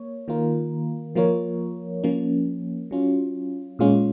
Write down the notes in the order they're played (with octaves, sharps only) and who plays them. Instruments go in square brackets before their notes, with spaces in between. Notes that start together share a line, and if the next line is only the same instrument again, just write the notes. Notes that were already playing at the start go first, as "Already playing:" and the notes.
Already playing: [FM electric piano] A#3 C#5
D#3 A#3 F4 A#4
F3 A#3 F4 A#4 C#5
F3 A#3 C#4
F#3 C#4 F4
A#2 G#3 C#4 F4